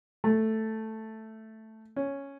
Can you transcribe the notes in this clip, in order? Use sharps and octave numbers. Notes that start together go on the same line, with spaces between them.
A3
C#4